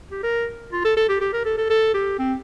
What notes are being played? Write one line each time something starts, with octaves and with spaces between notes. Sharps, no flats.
G4
A#4
F4
A4
A4
G4
G4
A#4
A4
A4
A4
G4
C4